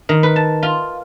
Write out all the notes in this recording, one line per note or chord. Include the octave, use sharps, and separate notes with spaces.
D#3
B4
A5
F4